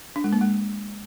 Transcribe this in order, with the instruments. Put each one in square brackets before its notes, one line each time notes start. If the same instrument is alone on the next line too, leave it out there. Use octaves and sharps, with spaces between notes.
[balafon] D4
G#3
A#3
G#3